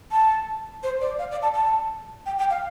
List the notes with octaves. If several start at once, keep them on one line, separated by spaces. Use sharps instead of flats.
A5
C5
D5
F5
D5
A5
A5
G5
G5
F5